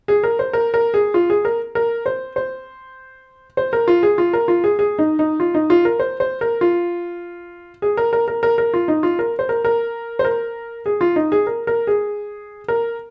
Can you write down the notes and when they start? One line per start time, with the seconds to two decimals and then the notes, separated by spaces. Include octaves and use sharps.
0.08 G#4
0.24 A#4
0.39 C5
0.53 A#4
0.74 A#4
0.94 G#4
1.14 F4
1.30 G#4
1.45 A#4
1.75 A#4
2.06 C5
2.36 C5
3.57 C5
3.73 A#4
3.88 F4
4.03 G#4
4.18 F4
4.33 A#4
4.48 F4
4.64 G#4
4.79 G#4
4.99 D#4
5.19 D#4
5.40 F4
5.54 D#4
5.70 F4
5.85 A#4
5.99 C5
6.20 C5
6.41 A#4
6.61 F4
7.82 G#4
7.97 A#4
8.13 A#4
8.28 A#4
8.43 A#4
8.58 A#4
8.74 F4
8.88 D#4
9.03 F4
9.19 A#4
9.39 C5
9.49 A#4
9.65 A#4
10.19 C5
10.25 A#4
10.86 G#4
11.01 F4
11.16 D#4
11.32 G#4
11.47 A#4
11.67 A#4
11.87 G#4
12.68 A#4